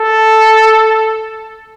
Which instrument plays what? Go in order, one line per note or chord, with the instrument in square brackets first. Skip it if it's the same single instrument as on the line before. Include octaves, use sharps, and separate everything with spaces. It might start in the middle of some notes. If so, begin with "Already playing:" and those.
Already playing: [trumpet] A4